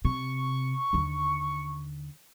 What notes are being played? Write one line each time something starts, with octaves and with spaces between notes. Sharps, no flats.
C3 C#6
D#2 D3